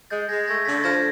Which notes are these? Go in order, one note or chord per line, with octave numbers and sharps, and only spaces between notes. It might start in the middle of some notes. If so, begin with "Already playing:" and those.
G#3 G6 A6
G#3 G#6 A#6
A3 G#6 A#6
D3 A6 B6
F3 G#6 A#6